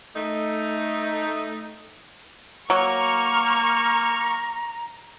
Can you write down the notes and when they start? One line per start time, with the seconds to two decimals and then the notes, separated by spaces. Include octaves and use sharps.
0.15 A3 D#4
2.70 F#3 A#3 A#5 C#6 F6